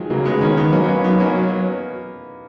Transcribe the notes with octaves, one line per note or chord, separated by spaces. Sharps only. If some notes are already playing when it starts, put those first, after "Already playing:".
Already playing: D#3 F3 F#3 G#3
C#3 F#3 A#3
G#3 B3
D#3 A#3 C#4
B3 D#4
F#3 A#3 C#4
B3
A#3 C#4
B3 D#4
A#3 C#4